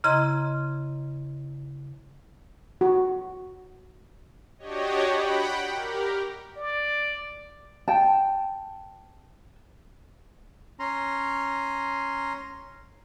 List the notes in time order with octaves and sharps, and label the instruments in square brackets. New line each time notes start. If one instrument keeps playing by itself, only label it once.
[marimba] C#3 E4 D#5 A#5 C6 G#6
[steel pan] F#4
[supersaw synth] D4 F#4 G4 C#5 D#5
F#5 G5 B5
G4 A#4
[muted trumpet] D5
[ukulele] G5 A5
[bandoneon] C#4 A#5 C6